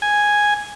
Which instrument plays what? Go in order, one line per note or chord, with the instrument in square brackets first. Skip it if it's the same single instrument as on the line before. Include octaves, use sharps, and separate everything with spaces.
[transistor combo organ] G#5